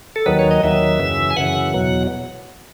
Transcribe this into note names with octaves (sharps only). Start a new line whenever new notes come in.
A4
D#2 D#3 F#3 B4
C#5
D#5
D#2 D#3 F#3 E5
F#2 C#3 E3
G#5
F#2 C#3 E3 F#5
E2 B2 F#3